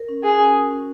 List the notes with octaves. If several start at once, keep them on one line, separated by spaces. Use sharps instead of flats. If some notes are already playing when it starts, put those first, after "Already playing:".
Already playing: A#4
C#4
F#4 G#4
C#4
A#4
C#4